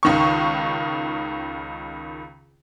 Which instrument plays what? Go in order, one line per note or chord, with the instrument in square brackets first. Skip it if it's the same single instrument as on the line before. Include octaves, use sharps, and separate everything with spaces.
[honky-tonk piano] C#2 D#3 C#6